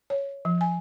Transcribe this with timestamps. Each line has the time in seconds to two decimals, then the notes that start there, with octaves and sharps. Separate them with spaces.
0.10 C#5
0.45 F3
0.61 G#5